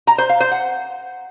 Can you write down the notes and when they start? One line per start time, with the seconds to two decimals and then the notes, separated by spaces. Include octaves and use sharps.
0.07 A#5
0.18 C5
0.29 F5
0.40 C5
0.51 F#5